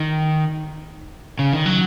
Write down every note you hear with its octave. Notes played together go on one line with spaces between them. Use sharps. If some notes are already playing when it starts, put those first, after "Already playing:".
Already playing: D#3
C#3
D#3
F#3